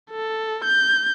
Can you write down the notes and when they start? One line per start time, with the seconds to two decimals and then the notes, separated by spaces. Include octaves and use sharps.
0.11 A4
0.64 G6